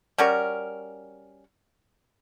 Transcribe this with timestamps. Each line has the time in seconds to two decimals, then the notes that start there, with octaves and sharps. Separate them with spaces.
0.18 G3 C#4 F#4 A#4